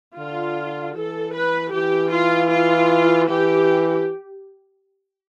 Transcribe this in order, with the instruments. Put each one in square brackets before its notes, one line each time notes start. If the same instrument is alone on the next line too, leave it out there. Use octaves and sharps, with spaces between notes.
[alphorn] D3 [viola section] F4
[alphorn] E3 [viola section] A4
[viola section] B4
[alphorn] E3 [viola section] G4
[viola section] F4
F4
[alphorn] E3 [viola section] G4